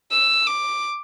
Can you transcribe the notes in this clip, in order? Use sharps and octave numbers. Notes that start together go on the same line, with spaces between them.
E6
D6